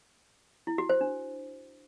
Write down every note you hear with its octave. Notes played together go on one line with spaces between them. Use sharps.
E4
F#4
C5
D4